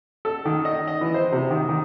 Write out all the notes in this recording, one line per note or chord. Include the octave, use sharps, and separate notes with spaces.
A4
D#3
D#5
D#5
E3
C5
C3
D#3
D#3